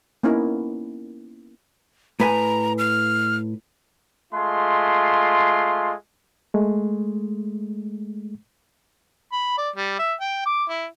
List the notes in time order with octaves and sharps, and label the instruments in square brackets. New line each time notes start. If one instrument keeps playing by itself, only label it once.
[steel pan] A#3 B3 C#4 D#4 E4 A#4
[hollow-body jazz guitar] A2 B4 G#5 [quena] A#5
[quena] F6
[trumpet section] G#3 A3 F4 C6
[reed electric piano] G#3 A3
[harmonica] B5
D5
G3
E5
G5
D6
E4